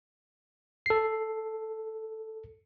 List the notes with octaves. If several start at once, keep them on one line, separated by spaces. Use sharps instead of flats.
A4 C7